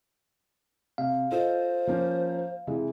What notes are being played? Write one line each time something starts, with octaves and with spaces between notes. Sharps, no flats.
C3 F5
F4 A4 C5 D#5
F3 A#3 C#4
C3 E3 G#3